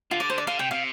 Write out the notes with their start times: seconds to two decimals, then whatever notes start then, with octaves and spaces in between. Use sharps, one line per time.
0.11 D3 F4
0.20 D5
0.30 C5
0.38 D5
0.47 D3 F5
0.59 C3 G5
0.71 C3 F5